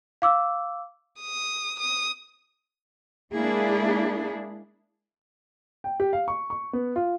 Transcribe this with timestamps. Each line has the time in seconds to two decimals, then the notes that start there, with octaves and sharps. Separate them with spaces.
0.22 F5 D6 E6
1.20 D#6
1.80 D#6
3.35 G#3 A#3 D4 E4 G#4
5.84 G5
6.00 G4
6.13 F5
6.28 C#6
6.50 C#6
6.73 B3
6.96 F4